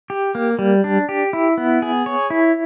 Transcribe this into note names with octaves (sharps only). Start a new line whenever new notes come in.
G4
A#3
G3
D4
G4
E4
B3
G#4
C#5
E4